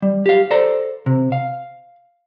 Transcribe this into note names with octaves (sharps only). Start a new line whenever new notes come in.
G3
G4 F5
A4 C5 D5 A#5
C3
F5